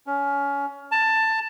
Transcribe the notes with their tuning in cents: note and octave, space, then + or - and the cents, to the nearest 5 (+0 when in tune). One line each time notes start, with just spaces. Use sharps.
C#4 +20
A5 +15